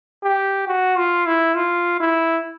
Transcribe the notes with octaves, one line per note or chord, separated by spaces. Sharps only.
G4
F#4
F4
E4
F4
E4